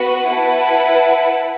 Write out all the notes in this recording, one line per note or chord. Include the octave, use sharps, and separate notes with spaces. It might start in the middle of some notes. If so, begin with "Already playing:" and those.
Already playing: B3 F#4 B4 F#5
E4 B4 F#5 A5